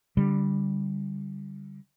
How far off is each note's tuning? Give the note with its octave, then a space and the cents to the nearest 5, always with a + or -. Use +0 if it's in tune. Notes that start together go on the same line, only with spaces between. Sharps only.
D3 -15 G3 +0